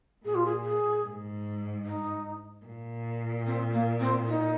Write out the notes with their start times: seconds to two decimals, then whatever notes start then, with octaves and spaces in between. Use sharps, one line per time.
0.24 A#2 G#4
0.35 F4
0.45 G#4
0.64 G#4
1.05 G#2
1.85 D#4
2.66 A#2
3.47 C4
3.73 A#3
4.00 C4
4.27 D#4